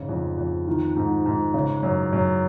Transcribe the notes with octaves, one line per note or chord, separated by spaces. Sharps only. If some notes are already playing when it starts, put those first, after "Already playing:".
Already playing: G#2 C#3
F2
F2
D#3
G#2
G#2
C#3
F#2
F#2